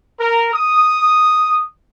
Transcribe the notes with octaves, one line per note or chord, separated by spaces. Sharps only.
A#4
D#6